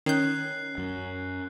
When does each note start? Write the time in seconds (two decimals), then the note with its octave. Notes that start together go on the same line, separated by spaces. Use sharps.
0.06 D#3 C#4 F#6 G6 C7
0.78 F#2